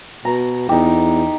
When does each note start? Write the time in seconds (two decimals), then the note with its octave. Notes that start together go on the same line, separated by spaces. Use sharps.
0.25 B2 A#5
0.69 E2 D#4 G4